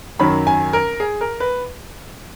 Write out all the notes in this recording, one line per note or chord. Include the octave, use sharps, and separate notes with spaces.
F#2 D#3 F#3 B5
G#5
A#4
G#4
A#4
B4